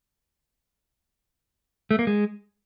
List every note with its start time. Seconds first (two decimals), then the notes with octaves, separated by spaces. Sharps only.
1.91 A3
1.99 A#3
2.07 G#3